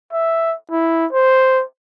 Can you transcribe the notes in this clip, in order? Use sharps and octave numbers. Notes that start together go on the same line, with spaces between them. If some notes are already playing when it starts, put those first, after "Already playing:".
E5
E4
C5